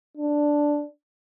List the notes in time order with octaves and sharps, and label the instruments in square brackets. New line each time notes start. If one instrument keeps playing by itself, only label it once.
[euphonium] D4